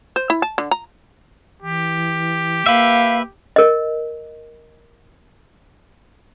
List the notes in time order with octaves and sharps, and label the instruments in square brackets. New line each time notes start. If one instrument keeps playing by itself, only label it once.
[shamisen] C5
E4
A5
D3
A#5
[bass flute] E3 [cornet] G4
[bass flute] A#3 [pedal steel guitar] B4 E5 [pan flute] F5
[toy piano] A#4 D#5